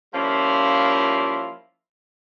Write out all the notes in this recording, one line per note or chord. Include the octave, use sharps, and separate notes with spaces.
F3 G3 A#3 C#4 E4 F4